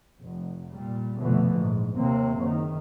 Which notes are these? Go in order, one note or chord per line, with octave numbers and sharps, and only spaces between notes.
F1
A#2 G3
F1 B2 D3 E3 F3 A3
A#1 G#2
D#2 C3 A#3 C4
F#1 D#3